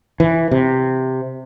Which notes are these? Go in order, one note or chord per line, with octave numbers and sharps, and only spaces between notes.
E3
C3